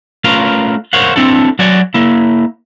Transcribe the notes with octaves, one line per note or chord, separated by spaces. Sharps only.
A3 C#4 F4 A#4 B4 F5
A#4 C5 C#5 F5 F#5
C4 D4 E4 A4
F#3 F#4 D5 F#5 G#5
A#3 E4